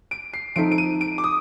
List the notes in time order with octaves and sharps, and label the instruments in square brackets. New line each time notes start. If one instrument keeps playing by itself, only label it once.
[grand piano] D7
C7
[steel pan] F3 C4 D#4 A4 [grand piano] D7
[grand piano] D7
D#7
D7
D6
D#6